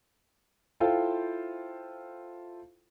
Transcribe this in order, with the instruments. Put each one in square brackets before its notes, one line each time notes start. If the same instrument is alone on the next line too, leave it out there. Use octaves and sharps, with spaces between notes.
[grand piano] E4 F4 A4 C5 F5 G5